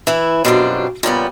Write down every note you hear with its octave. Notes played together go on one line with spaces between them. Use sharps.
E3 E4
F#2 B2 G3 C4 D4 F4
A#2 C#3 G3 B3